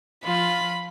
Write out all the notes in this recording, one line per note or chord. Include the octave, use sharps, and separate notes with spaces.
F3 F4 B5